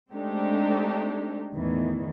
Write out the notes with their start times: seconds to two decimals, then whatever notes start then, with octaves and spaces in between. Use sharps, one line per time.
0.12 G#3 A3 C4 D4 D#4 G4
1.55 E2 A2 D#3 E3